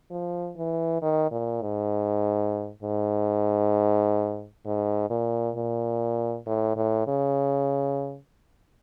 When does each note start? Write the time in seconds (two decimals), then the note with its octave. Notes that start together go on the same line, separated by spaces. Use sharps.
0.11 F3
0.57 E3
1.02 D#3
1.31 A#2
1.62 G#2
2.83 G#2
4.66 G#2
5.10 A#2
5.56 A#2
6.46 A2
6.76 A2
7.07 C#3